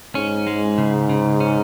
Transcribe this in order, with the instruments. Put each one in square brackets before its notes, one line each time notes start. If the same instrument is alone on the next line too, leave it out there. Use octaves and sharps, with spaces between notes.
[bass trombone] G#2 [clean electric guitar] C#4
[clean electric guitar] G#3
C#3
C#3
C#4